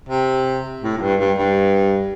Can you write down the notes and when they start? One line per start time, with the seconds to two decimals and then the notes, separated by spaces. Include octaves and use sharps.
0.09 C3
0.83 A2
0.97 A2
1.02 G2
1.20 G2
1.38 G2